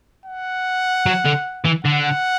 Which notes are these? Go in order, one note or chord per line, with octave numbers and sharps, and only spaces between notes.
F#5
F#3
D3
E3
D3 F#5